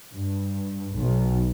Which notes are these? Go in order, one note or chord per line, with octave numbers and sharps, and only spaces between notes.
G2
B1